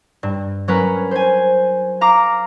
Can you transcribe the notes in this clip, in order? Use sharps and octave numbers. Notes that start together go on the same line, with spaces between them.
G2
F#3 C#4 A#4 B4
C5 G#5
F5 A#5 D6